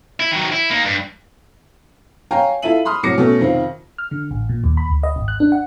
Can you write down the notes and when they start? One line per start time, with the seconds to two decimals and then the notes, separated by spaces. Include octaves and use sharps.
0.20 E4
0.31 D#3 F#3
0.52 E4
0.70 A#3 D#4
0.85 G2
2.31 C#5 F5 G5 G#5 A#5
2.62 E4 F4 A4 E5 D#7 F#7
2.85 B5 C6 D#6 F6
3.03 C2 A2 F#3 D6 A#6 C#7
3.18 B2 A3 C#4 A4 C#5
3.39 F2 C3 D#3 C4 F4
3.98 F6
4.11 D3
4.31 A1
4.49 A#2
4.64 D#2
4.77 B5
4.89 D2
5.03 D#5
5.16 G#1
5.28 F#6
5.40 D4
5.52 F#5